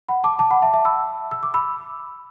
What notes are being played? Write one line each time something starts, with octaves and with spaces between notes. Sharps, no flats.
F#5 B5
A5 D6
A5 D6
F#5 B5
E5 A5
E5 A5
B5 E6
E6
D6
B5 E6